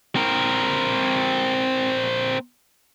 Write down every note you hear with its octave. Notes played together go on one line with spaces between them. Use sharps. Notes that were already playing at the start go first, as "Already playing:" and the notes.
C4 A#4